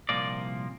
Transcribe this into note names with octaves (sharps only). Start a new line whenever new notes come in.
C2 A#2 F3 A#3 D5